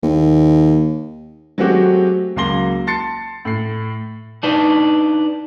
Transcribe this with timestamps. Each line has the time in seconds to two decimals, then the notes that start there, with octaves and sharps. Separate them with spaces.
0.03 D#2
1.58 F#3 G#3 A3 C4 F#4 G4
2.36 C#2 F#3 A#3 C6 A#6 G7
2.87 A5 C6 A6 C7 C#7
3.45 A2 C7
4.43 D4 D#4 B4